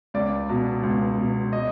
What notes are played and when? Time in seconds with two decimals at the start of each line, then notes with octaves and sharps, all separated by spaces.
0.14 C#2 D5
0.49 B2
0.83 C#2
1.18 B2
1.53 D#5